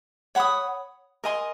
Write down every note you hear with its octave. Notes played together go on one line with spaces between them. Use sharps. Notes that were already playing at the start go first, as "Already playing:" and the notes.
C#5 F#5 B5 D#6
A#4 D#5 G#5 C6